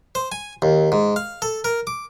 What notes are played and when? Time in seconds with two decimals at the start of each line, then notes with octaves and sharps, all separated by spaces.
0.15 C5
0.32 G#5
0.62 D#2
0.92 G#2
1.16 F5
1.42 A4
1.64 A#4
1.87 D6